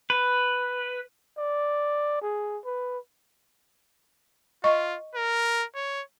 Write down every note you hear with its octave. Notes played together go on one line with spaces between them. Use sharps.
B4
D5
G#4
B4
F4 D#5 C#6
A#4
C#5